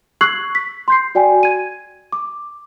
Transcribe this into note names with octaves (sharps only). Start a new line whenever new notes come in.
C#6 E6 F#6 G#6 C7 F#7
B6
C6 G6 C7
F#4 D5 G5 G#5
G#6 D#7
D6